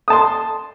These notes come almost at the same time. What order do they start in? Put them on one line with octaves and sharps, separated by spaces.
D#6 A5 C6